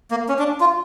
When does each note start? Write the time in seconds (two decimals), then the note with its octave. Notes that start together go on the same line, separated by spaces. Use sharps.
0.11 A#3
0.29 C#4
0.39 D4
0.60 F4